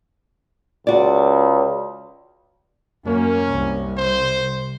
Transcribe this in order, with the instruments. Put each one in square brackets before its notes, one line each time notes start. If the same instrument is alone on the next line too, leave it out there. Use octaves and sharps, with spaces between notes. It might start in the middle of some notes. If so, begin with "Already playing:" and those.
[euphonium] C#2 [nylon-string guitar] F#4 D5
[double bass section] F#2 A#3 [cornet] C#4
[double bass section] C2
[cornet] C5